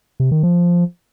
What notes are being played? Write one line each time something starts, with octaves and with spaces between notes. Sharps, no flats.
C3
D#3
F3